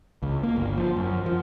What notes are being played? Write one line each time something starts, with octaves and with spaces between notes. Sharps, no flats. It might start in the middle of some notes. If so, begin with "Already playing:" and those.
C#2
A#3
G1
F3
F#2
F3